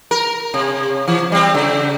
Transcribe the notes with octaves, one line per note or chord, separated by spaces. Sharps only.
A#4
C3
E3
G3 C4
C#3